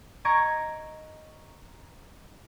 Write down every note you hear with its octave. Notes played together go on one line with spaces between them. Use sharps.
D#5 A#5 C#6 G#6 D7